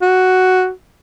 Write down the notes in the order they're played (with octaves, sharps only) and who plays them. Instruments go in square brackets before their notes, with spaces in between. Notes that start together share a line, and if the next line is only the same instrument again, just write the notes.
[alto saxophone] F#4